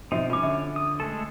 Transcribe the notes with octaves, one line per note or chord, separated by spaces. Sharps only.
B2 F3 C4 D#4 F#4 E5
C#4 F4 D6
D3 E5
D#6
G#3 A3 A4